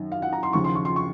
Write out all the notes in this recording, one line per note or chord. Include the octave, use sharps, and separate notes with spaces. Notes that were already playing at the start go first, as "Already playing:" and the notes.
Already playing: F#2 D#3
F5
F#5
A#5
C6
D#2 C#3 F3 C#6
C6
C#6
C6
C#6